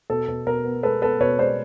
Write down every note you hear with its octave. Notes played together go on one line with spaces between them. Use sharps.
B2 A4
B2
B2 A#4
B3
G#3 A4 B4
B3 A4 B4
B2 B4 C#5
G#3 C5 D5